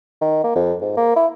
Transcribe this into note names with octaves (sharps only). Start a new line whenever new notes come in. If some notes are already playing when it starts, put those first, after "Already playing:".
D#3
A#3
F2
G#2
A#3
E4